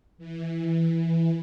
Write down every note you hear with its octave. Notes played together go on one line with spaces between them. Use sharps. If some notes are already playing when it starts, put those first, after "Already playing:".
E3